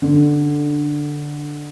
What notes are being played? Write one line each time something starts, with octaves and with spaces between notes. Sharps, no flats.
D3